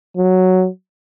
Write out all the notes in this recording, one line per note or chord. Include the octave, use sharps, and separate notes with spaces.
F#3